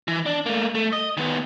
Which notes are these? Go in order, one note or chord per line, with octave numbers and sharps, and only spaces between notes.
E3
D4
A3 A#3
A3
D#5
D#3 B3